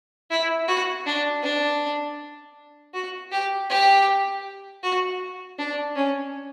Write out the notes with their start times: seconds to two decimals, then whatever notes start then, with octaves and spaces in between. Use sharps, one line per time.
0.30 E4
0.68 F#4
1.06 D4
1.43 D4
2.94 F#4
3.32 G4
3.70 G4
4.83 F#4
5.58 D4
5.96 C#4